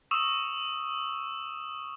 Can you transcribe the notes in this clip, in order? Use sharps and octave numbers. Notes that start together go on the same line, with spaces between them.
C#6 D#6 E6 E7